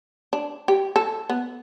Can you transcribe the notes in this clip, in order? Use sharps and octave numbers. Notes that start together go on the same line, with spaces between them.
D4
G4
A4
B3